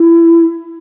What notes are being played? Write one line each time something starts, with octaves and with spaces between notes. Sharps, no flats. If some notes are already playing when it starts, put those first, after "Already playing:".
Already playing: E4